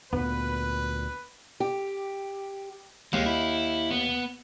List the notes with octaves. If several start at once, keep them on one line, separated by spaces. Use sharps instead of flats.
D2 A#2 B3 B4
G4
D#2 G#3
E4
B3